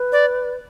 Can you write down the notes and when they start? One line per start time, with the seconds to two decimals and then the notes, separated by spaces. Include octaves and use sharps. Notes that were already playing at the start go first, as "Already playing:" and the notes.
Already playing: B4
0.12 D5